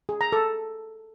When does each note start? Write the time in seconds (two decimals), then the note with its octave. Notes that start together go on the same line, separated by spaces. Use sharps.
0.09 G#4
0.21 A#5
0.32 A4